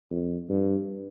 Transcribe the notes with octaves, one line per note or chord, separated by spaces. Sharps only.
F2
G2